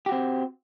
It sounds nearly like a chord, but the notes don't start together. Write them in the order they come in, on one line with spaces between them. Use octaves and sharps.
G4 F#4 C4